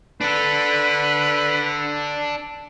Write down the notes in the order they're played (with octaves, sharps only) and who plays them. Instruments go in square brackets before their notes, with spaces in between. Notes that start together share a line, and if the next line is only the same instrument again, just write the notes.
[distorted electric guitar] D4 A4 [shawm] B4